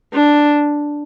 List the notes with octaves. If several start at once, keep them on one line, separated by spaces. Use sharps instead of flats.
D4